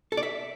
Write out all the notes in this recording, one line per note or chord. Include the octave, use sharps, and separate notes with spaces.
A4
D5
E5